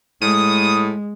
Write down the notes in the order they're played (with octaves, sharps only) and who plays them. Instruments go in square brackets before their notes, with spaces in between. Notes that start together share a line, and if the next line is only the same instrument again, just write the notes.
[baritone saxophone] A2 [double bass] G#3 [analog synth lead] D#6